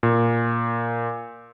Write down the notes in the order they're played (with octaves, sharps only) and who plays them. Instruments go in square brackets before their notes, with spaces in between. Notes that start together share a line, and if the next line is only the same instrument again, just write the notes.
[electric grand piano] A#2